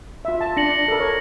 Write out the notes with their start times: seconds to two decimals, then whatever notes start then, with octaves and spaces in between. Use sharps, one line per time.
0.25 F4 E5
0.41 A5
0.57 D4 A#6 C#7 F#7
0.72 C#7
0.88 A4 A#4
1.00 C#5